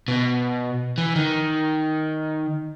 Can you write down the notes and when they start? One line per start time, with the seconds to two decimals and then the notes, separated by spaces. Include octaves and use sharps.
0.08 B2
0.98 E3
1.16 D#3